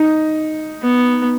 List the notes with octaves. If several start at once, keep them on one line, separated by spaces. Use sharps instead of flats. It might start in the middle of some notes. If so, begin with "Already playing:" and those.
Already playing: D#4
B3